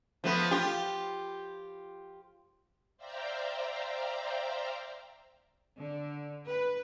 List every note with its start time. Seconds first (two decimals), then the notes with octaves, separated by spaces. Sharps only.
0.24 F3 A3 B3
0.51 F4 G4
2.97 C5 D5 E5 F5 G5 A#5
5.79 D3
6.48 B4